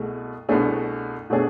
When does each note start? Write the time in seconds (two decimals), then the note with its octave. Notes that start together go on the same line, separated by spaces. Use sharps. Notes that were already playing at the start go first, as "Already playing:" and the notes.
Already playing: C2 B2 A3 G#4
0.49 C2 B2 A3 D4 G#4
1.30 B2 A3 D4 G#4